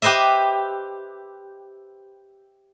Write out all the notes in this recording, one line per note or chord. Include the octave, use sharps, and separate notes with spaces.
G4 B4 C5 D#5 E5